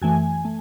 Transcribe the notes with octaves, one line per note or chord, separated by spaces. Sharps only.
F#2 E3 A3 G#5
A3